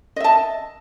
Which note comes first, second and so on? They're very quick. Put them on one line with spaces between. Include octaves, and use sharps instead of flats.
D#5 E5 A5